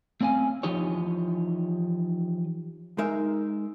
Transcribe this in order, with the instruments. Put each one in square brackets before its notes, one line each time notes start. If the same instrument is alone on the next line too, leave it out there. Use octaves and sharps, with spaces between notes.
[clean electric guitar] A3 C4 C#4 F5 G#5
E3 F3 D#4 G4 C#5
[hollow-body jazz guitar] G#3 D#4 A#4 E5